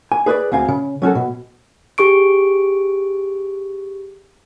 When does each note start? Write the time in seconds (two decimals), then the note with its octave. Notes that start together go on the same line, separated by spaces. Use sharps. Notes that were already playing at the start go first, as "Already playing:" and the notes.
0.12 G#5
0.26 G#4 B4 C5 D5
0.52 D2 C4 F5 G#5
0.68 C#3
1.02 F#3 C#4 F#4 A4
1.15 B2
1.98 G4 G#4 C#6 D7